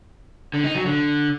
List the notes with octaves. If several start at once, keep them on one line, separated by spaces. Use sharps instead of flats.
D3
D#4
F#3
D3